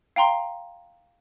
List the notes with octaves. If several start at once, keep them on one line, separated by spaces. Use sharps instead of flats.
F5 G5 A#5 C6